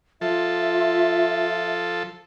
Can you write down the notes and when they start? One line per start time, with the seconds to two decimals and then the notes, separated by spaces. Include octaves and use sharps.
0.21 F3 F4 A4 E5